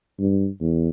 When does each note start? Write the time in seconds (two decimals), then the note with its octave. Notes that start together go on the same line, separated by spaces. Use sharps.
0.19 G2
0.61 E2